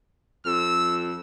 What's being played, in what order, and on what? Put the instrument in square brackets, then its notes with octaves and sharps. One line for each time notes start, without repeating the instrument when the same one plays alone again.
[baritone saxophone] F2 [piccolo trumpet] E6